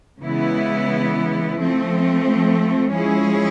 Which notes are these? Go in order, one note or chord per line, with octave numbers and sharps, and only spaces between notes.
C#3 E3 G#3 B3 E4
F3 A3 C4
F3 G#3 C#4 E4 G#4